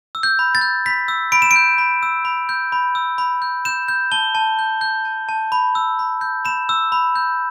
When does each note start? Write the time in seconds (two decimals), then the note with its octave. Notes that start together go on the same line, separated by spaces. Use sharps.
0.15 E6
0.23 G6
0.39 B5
0.55 A6
0.61 G6
0.86 B5 B6
1.08 E6
1.32 B5 D7
1.42 E7
1.51 D7
1.56 G6
1.78 B5
2.03 E6
2.25 B5
2.49 G6
2.72 B5
2.95 E6
3.18 B5
3.42 G6
3.65 G6 E7
3.88 G6
4.12 A5 G7
4.35 A5
4.59 G6
4.81 G6
5.05 A5
5.29 A5
5.52 B5
5.75 E6
5.99 B5
6.21 G6
6.45 B5 E7
6.69 E6
6.92 B5
7.16 G6